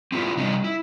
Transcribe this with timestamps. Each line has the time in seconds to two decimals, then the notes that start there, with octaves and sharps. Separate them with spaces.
0.12 C4 E4 F4 G#4 B4
0.37 C3 G3 D4 D#4 D#5
0.64 E4